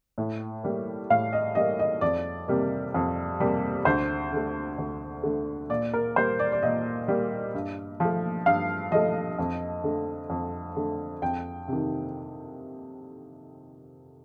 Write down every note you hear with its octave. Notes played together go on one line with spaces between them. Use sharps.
A2
G3 A#3
A2 F5
D#5
G3 A#3 D#5
D#5
F2 D5
C3 G3 A#3
F2
C3 G3 A#3
D2 C5
D3 A3
D2
D3 A3
A#2 D5
A#4
G3 A#3 C5
D5
D5
A#2 D#5
G3 A#3
G2
F3 A3
G2 F5
F3 A3 D#5
F2
D3 A3
F2
D3 A3
F2 G5
C3 D#3